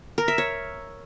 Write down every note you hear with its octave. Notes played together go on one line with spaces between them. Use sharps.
A#4
E5
C#5